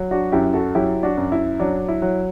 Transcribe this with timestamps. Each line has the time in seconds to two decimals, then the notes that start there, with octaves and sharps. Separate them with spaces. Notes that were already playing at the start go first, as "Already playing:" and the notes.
Already playing: F#3
0.11 D4 F#4
0.32 F#2 E4 G4
0.53 F#4 A4
0.75 F#3 E4 G4
1.03 D4 F#4
1.17 F#2
1.32 E4
1.60 F#3 D4
1.88 E4
2.02 F#3